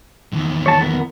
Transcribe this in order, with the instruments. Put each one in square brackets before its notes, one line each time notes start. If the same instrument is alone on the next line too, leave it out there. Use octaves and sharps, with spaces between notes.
[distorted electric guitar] E2 D#3
[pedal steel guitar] C#5 A5
B3 A#4